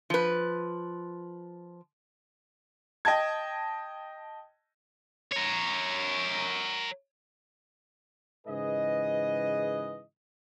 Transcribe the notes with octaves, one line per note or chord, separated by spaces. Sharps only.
F3 B4
D#5 G5 A5 G#6
A#4 C#5
G#2 C#3 E3 G#4 B4 D#5